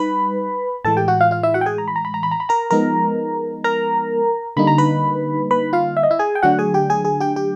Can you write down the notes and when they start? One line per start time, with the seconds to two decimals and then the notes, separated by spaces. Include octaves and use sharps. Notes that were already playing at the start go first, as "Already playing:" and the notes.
Already playing: G3 D#4 B4 B5
0.85 A2 E3 G#3 A4 A5
0.97 G4 G5
1.08 F#4 F#5
1.20 F4 F5
1.31 F4 F5
1.43 E4 E5
1.54 F#4 F#5
1.61 G5
1.66 G#4 G#5
1.78 A#5
1.88 B5
1.96 A#5
2.05 B5
2.14 A#5
2.23 B5
2.31 A#5
2.40 B5
2.49 A#4 A#5
2.71 F3 G#3 B3 D#4 A#4 A#5
3.64 A#4 A#5
4.57 D3 G3 A#3 D#4 B5
4.67 A#5
4.78 B4 B5
5.51 B4 B5
5.73 F4 F5
5.97 E5
6.03 D#5
6.11 E4 E5
6.19 G#4 G#5
6.35 G5
6.43 D3 F#3 A3 D4 F#4 F#5
6.59 G#4 G#5
6.74 G4 G5
6.90 G#4 G#5
7.05 G#4 G#5
7.20 G4 G5
7.36 G4 G5